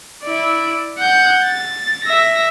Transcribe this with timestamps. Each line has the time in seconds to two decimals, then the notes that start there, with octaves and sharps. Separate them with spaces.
0.24 E4 D5
0.98 F#5 G6
1.45 A6
2.05 E5 A#6